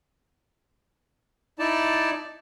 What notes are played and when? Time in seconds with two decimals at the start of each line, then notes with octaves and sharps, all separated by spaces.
1.59 D#4 E4 D5 A5